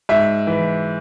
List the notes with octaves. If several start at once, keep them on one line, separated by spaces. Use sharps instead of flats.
G#2 E5
E3